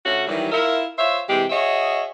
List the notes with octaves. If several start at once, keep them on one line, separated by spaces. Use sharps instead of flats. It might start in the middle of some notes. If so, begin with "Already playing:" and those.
D3 A3 C#4 F#4
D#3 E3 F#3 G3
E4 F4 A#4 E5
F4 C5 C#5 E5
C3 E3 G#3 G4
F#4 G#4 C#5 D#5 E5